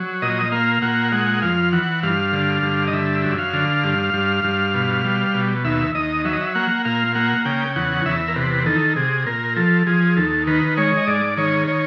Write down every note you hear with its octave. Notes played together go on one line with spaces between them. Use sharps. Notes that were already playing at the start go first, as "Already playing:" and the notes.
Already playing: F#3
A#2 D#5
A#3 F5
A#2 F#5
G#3 F#5
F2 F5
E3 F#5
G2 F5
D3
G2
D#5
D3 E5
F#2
F5
D3
G2
G2
G2
B2
G3
B2
D#2 E5
D#2 D#5
F#3 E5
D#5
E5
A#3 F#5
A#2 F5
A#3 F#5
C#3 G5
E2 F#5
E2 E5
A#4
C3 B4
D#3 A4
C3 G#4
A#2 A#4
F3 A4
F3 G#4
D#2 A4
D#3 B4
G#3 C#5
D#5
G#2 D5
D#3 C#5
C#5